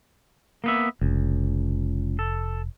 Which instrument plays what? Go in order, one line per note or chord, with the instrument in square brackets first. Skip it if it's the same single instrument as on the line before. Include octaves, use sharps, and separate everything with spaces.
[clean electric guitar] A#3 B3 E5
[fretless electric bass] F1 [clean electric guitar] C#2
[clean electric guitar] A4